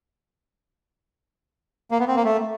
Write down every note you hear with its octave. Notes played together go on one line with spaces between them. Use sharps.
A#3
B3
C4
A#3
A3